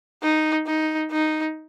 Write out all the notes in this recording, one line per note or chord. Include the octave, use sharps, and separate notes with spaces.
D#4
D#4
D#4